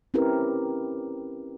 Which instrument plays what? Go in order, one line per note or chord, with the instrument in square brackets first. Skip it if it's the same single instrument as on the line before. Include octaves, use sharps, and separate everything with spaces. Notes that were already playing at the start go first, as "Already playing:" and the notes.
[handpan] C4 C#4 E4 G4 A#4 B4